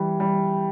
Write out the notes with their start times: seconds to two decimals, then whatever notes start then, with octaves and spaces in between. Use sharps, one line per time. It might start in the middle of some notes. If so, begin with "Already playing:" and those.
Already playing: E3 G3
0.20 G3